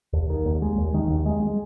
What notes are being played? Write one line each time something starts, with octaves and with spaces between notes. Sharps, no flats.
D#2
D#3
D#2
G#3
D#2
D#3
D#2
G#3
G#3